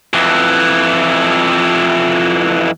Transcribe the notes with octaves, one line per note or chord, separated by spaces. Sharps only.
F2 E3